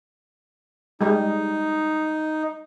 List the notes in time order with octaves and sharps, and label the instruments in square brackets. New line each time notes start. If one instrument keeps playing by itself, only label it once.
[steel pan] G3 G#3 G4 [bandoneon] D#4